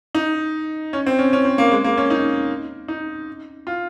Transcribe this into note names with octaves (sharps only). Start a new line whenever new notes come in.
D#4
C#4
C4
C#4
C#4
C4
A#3
G#3
A#3
C#4
D#4
D#4
F4